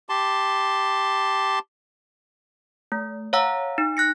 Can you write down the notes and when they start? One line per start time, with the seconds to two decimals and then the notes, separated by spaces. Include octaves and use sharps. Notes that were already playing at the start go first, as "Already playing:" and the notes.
0.09 G4 A5 C6
2.92 A3
3.33 C#5 F5 F#5 A#5 E6
3.78 D#4
3.97 F#6 A#6 C#7